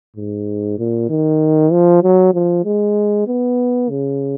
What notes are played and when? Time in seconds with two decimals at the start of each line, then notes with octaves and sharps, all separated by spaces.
0.17 G#2
0.78 A#2
1.10 D#3
1.72 F3
2.03 F#3
2.34 F3
2.65 G#3
3.27 B3
3.90 C#3